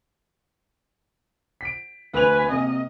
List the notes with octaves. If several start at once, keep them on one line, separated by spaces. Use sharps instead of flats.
B6 D7
D2 B4 G#5 F7
C3 A#3 D#5